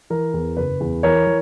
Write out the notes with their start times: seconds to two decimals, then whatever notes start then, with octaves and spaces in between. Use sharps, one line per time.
0.10 E3 A#4
0.34 E2
0.57 F#1 B4
0.80 E2
1.03 E3 A#4 C#5
1.27 E3